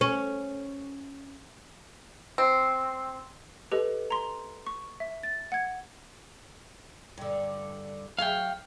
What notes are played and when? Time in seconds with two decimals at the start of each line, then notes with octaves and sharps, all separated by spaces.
0.01 C#4
2.38 C4
3.72 G4 A4 B4 D#5
4.10 A#5 C6
4.67 C#6
5.00 E5
5.23 A6
5.52 F#5 G#6
7.18 G2 D3
8.19 F#3 G#4 E5 F5 G5